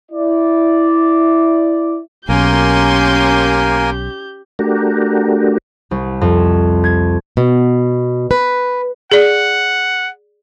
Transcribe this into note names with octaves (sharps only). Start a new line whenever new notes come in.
E4 D5
B1 A#3 C#4 G4 A#4 G#5 C6 G6
A3 D4 F#4 G4 A#4
C2
F2
G#6
B2
B4
G#4 D5 F#5